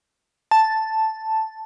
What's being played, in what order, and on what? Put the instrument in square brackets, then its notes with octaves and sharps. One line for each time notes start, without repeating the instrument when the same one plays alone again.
[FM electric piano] A5